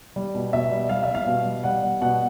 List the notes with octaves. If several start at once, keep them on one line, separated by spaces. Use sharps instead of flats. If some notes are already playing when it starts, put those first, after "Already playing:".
G3
B2
B2 E5
G3
G3 F5
E5
G3
F5
B2
G3
G3 F#5
G3
B2 F#5